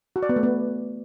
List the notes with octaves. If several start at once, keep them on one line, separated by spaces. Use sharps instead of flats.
F#4
D5
B3
A3
B3